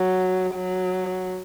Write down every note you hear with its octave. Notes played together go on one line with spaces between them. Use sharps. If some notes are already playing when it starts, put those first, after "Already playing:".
Already playing: F#3
F#3